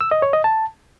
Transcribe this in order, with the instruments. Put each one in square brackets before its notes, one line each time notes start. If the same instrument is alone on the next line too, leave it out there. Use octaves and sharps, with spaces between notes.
[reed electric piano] E6
D#5
C#5
D#5
A5